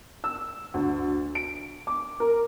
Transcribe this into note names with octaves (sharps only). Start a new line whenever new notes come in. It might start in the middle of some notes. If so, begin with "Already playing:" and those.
E6
D2
D7
D6
A#4